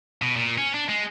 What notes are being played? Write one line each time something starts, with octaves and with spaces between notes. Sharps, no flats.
B2
A#2
C#4
D4
G#3